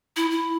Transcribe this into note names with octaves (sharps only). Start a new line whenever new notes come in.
E4
E4